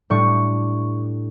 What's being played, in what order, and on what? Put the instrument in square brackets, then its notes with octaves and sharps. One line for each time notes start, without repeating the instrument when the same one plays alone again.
[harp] A2 G3 D4 C#6